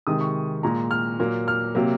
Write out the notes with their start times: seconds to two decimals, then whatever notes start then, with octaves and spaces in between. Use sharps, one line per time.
0.07 C3 D#3 G#3 D#6
0.21 C#6
0.63 A#2 G#3 A#5
0.91 F6
1.19 A#2 F#3 A#3
1.48 F6
1.75 C3 F#3 A#3